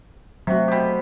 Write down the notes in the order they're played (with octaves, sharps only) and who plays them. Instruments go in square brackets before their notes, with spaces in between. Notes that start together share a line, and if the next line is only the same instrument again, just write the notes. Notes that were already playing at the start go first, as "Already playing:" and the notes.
[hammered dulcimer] C3 F#4 [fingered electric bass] F#3 A3
[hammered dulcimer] B2 G4